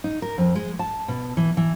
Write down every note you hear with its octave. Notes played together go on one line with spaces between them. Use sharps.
D#4
A#4
F2
G#3
A5
B2
E3
E3